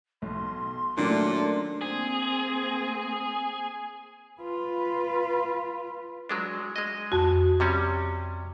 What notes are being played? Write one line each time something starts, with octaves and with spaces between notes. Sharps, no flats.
B1 C6
A#2 D#3 F#3 A3 C#4 D4
A#3 C4 G#4
F4 B4
F#3 G#3 D4
G#3 D#5
F2 F#4
C3 G3 C#4